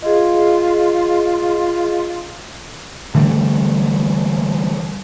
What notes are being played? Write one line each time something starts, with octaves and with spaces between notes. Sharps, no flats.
F4 G#4 D#5
D3 E3 G3 A3